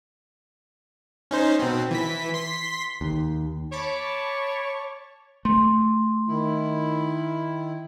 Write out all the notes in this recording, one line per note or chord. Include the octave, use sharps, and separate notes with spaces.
C#4 D#4 C5
B2 C4
E3 B6
C6 B6
D#2
C#5 A5 B5 D6
A3 C6
D#3 E4